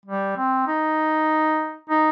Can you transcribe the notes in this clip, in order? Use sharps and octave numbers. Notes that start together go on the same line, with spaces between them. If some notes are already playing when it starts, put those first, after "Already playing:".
G3
C4
D#4
D#4